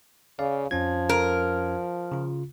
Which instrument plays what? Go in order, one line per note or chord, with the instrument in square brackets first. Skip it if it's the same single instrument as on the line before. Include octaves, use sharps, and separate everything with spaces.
[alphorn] C#3 [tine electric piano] D5 F5
[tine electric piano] F2 C#4 G#6 [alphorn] F3
[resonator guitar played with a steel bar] A#4
[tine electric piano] C#3 F4